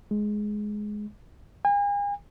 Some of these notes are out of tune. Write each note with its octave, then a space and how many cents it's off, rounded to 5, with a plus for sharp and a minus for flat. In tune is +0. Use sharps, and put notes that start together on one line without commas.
G#3 +10
G#5 -40